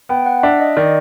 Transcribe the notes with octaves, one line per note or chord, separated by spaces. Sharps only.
B3 G5
F#5
D4 E5
D#5
D#3 D5